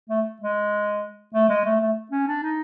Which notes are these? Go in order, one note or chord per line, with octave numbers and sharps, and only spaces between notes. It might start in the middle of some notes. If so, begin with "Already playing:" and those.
A3
G#3
A3
G#3
A3
A3
C#4
D4
D#4